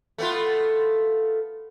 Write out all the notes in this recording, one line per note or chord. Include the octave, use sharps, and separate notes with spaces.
A3 B3 F4